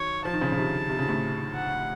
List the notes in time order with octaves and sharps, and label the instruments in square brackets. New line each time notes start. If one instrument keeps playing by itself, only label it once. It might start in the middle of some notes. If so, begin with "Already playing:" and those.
Already playing: [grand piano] D#3 F#3 [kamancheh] C#5
[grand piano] F3 [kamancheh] A5
[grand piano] D#3
C#3 F3
C#3
C3 D#3
C3
C#3
A2 C3
[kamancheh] F#5